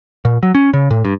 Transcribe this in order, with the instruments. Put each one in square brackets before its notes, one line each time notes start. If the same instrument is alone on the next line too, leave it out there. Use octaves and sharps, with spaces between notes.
[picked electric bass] A#2
F#3
C#4
C#3
A2
G2